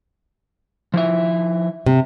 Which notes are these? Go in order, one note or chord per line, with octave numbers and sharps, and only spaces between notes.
F3 E4 E5
C3